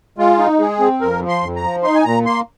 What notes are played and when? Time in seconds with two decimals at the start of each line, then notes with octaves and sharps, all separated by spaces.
0.18 G#3 F4
0.38 D#4
0.60 G#3 G#4
0.80 C4
1.01 F2 A#4
1.22 F3
1.28 C6
1.42 F2
1.56 A#5
1.63 F3
1.83 D#4 C6
1.95 G#5
2.04 A#2 A#5
2.25 A#3 C6